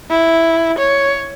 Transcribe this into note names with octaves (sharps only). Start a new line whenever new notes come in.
E4
C#5